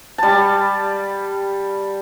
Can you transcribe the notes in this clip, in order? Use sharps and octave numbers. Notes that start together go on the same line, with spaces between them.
G3 A5